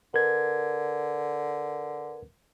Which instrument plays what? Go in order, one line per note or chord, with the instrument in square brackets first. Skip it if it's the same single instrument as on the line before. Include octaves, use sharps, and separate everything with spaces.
[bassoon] D3 [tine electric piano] A#4 B4 G#6